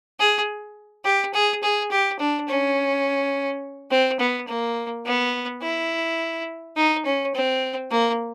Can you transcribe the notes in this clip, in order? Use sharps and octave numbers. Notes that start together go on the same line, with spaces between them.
G#4
G4
G#4
G#4
G4
D4
C#4
C4
B3
A#3
B3
E4
D#4
C#4
C4
A#3